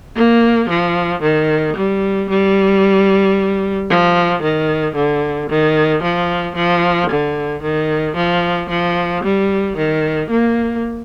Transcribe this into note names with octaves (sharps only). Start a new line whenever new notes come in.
A#3
F3
D#3
G3
G3
F3
D#3
D3
D#3
F3
F3
D3
D#3
F3
F3
G3
D#3
A#3